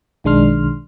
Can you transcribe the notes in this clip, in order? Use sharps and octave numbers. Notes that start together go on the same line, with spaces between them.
B1 D#3 G#3 D4 C6 F6